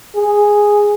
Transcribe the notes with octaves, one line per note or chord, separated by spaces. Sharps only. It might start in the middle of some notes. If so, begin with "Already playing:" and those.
G#4